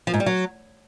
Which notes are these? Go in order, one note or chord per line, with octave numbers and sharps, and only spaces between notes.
F3
G#2
G3
F#3